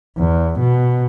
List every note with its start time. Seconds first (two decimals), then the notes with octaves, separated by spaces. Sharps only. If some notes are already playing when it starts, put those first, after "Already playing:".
0.18 E2
0.59 B2